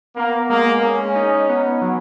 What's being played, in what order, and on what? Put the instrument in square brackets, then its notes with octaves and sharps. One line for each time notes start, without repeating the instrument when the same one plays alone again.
[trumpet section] A#3 [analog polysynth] B3
[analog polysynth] G#3 [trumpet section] A#3
[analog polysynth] G#3 [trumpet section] C#4
[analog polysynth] D#4
B3
F#3